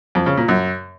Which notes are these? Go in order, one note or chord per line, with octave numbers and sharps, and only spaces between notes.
F2
C#3
A#2
F#2